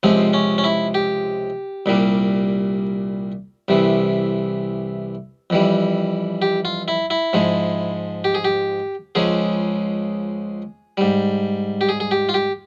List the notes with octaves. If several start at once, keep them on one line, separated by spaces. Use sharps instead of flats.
C#2 C3 F3 G#3 C4
C#4
C#4
E4
G4
C2 A#2 G3
C2 C3 E3
F2 E3 G3
G4
F4
E4
E4
G#2 F3 G#3
G4
G#4
G4
C#2 C#3 F3 G#3 G#4
G#2 G3
G4
G#4
G#4
G4
F4
G4